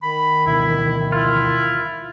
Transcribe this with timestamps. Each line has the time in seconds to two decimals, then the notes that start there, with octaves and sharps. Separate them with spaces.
0.02 D#3 B5
0.46 D2 B2 E3 E4
1.12 E4 F4